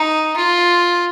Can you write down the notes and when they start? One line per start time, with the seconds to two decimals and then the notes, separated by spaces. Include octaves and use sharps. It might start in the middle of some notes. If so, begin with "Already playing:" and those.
Already playing: D#4
0.37 F4